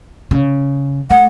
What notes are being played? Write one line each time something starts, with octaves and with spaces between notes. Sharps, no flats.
C#3
A3 F#5